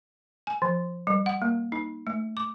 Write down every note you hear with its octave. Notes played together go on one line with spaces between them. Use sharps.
G#5
F3
G3
F#5
A#3
D#4
A3
D6